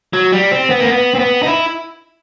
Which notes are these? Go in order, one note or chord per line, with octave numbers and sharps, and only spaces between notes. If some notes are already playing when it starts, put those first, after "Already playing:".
F#3
G3
C4
B3
A#3
B3
C4
B3
D#4
E4